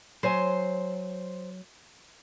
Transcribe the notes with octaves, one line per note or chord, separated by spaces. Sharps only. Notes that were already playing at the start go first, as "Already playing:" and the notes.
F#3 C5 C#5 G#5